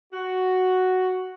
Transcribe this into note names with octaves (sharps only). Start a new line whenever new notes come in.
F#4